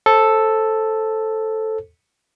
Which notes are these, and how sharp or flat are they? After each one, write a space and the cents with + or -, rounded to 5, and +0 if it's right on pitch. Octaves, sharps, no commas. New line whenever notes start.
A4 +0 C5 +25